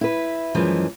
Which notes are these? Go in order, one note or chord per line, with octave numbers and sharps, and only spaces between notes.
E4 B4
F#2 E3 F3 G#3